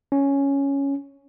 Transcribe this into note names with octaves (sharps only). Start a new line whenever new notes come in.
C#4